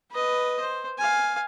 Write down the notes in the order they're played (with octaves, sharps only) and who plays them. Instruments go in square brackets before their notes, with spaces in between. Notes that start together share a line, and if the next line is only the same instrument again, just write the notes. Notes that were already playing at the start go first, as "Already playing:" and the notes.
[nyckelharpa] B4 D#5
C5
F5 G#5